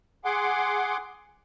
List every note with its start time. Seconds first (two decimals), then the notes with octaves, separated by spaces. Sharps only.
0.25 G#4 F#5 C6 D6